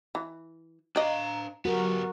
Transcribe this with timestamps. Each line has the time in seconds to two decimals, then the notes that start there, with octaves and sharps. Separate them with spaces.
0.15 E3
0.96 D4 D5 D#5 F5 A#5
1.65 F#3 B3 F#4 G4 A#4